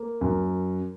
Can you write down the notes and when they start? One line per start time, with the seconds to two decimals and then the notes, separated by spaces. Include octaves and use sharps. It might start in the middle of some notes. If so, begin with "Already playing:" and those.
Already playing: A#3
0.21 F#2